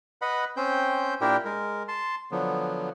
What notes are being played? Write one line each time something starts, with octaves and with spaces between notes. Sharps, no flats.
B4 D#5 F#5 B5
C4 C#4 C5 G5 G6
A#2 D4 E4 G4 A#4 G5
G#3 A#4
A5 C6
D3 F3 F#3 B3